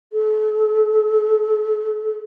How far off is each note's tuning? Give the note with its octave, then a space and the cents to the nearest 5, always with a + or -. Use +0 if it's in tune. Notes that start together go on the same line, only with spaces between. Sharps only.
A4 -40